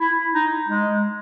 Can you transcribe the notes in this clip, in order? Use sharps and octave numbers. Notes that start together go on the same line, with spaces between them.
E4
D#4
G#3